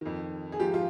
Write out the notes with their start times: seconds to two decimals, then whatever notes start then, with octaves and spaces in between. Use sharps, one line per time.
0.01 F2 D#3
0.52 G#4
0.60 G#2 F3 G4
0.74 F4